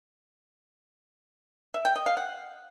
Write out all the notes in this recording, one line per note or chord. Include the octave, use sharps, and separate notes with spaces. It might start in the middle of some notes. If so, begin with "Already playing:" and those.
E5
G5
D#5
F5
F#5